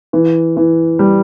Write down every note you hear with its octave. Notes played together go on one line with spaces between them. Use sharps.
E3
E3
G3